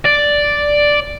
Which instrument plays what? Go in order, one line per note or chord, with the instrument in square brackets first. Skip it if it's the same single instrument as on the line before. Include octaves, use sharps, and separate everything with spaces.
[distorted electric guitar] D5